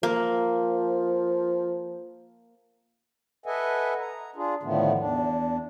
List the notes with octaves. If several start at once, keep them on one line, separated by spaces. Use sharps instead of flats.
F3 A#3
A4 B4 D#5 E5 F#5 G#5
A#5
D4 F4 G#4
A2 D3 D#3 F3 A3 B3
E2 D4